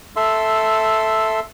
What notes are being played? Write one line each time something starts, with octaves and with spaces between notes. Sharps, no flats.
A4 E5 C6